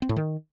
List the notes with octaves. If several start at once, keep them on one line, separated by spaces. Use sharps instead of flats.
C4
A2
D#3